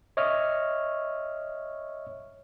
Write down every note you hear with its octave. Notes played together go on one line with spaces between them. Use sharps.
C#5 D#5 E5 C#6 F6